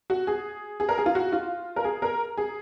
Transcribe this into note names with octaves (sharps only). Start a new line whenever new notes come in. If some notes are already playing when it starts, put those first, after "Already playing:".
F#4
G#4
G#4
A#4
G#4
F4
F#4
F4
A#4
G#4
A#4
G#4